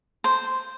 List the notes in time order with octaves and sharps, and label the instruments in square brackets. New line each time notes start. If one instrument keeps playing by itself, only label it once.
[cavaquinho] C5